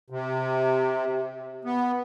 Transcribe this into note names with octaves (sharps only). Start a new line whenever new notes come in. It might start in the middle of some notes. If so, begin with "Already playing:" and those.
C3
B3